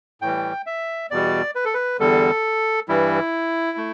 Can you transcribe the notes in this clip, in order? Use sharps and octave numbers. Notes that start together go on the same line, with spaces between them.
A2 E3 G3 G5
E5
E2 B2 G3 D5
B4
A4
B4
E2 D3 G3 A4
G2 E3 G3 E4
A3